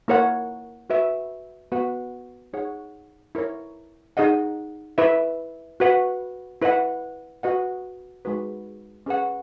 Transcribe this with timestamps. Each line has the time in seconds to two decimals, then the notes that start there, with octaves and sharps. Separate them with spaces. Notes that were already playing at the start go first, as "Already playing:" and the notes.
0.08 A#3 E4 A#4 C#5 F#5
0.90 F#4 B4 E5
1.72 B3 F#4 B4 F#5
2.53 D#4 G#4 C#5 F#5
3.35 E4 A#4 C#5
4.17 D#4 G#4 D#5 F#5
4.98 E4 B4 E5
5.80 F#4 B4 F#5
6.62 E4 B4 D#5 F#5
7.43 F#4 B4 D#5 F#5
8.25 G#3 D#4 F#4 B4
9.06 C#4 G#4 B4 F#5